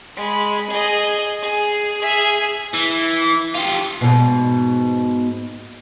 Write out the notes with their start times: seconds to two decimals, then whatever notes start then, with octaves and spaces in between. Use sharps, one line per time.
0.16 G#3 B5
0.70 G#4 D#5
1.43 G#4
2.01 G#4 E5
2.74 E3
3.54 F4 G4
4.01 G#2 B2